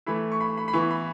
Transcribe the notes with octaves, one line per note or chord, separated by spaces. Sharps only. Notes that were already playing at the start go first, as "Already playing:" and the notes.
E3 A3 E4 B5
C#6
B5
B5
B5
E3 B3 E4 C#6
B5